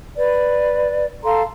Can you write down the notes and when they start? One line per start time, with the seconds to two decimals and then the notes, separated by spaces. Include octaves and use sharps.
0.15 B4 D5
1.24 A4 F5 A#5 C6